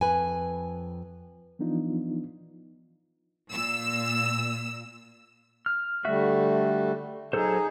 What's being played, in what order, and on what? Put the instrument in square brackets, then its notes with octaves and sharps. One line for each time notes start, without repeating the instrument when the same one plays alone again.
[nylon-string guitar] F2 G#2 B4 G#5
[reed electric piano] E3 F3 B3 D4 D#4 F4
[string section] A#2 E6
[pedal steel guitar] F6
[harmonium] D3 G3 A3 [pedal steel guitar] F#4 E5
[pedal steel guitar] F#3 A4 C5 [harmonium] D#4 G#4